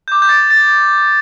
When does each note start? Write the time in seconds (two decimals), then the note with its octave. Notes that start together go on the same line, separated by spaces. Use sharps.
0.08 D6 G6
0.22 G6
0.29 A6
0.50 A6